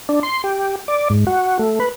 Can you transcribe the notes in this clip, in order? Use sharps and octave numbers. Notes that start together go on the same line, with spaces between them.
D4
C6
G4
D5
G#2
F#4
A3
B4